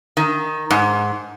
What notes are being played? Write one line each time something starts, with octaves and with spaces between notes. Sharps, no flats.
D#3
G#2